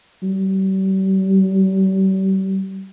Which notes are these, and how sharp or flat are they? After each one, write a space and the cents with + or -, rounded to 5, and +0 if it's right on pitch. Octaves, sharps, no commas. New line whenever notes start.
G3 -40